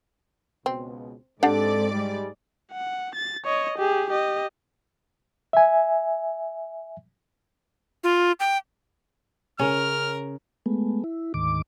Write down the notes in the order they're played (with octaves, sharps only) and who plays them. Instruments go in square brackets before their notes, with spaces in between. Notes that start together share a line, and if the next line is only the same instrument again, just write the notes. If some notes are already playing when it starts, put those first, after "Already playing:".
[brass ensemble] C#2 B2 [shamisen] C4
[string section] G#2 D5 [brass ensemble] C4 A4 [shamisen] D4 G4 F#5
[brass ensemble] G3 G#3
[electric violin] F#5
A6
C#5 D#5
G4 G#4
G4 D#5
[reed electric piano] E5 G#5
[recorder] F4
G5
[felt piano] C#3 [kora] C#4 [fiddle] A#4 [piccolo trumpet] F6
[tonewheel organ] G#3 A3 B3
E4
D2 G#2 D#3 D6